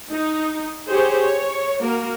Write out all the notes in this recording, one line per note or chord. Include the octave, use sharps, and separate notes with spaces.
D#4
G4 G#4 C5 C#5
C#5
A#3 F#4 A#4